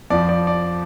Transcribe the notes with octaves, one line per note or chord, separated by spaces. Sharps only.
F2 F3 D5
D5
D5